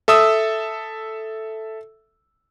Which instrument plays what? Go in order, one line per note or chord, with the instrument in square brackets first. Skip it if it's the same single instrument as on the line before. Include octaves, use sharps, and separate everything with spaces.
[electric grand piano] A4 E5 D#6 E6